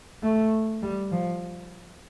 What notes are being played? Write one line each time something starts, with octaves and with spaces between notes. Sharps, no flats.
A3
G3
F3